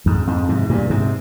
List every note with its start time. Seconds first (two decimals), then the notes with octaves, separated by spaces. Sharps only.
0.06 F2 G#2
0.27 F2 G#2
0.48 G#2 C3
0.70 G2 A#2
0.90 G#2 C3